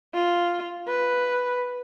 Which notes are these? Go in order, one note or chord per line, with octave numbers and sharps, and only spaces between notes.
F4
B4